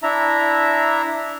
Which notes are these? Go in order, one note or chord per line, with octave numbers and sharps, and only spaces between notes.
D4 E4 E5 A#5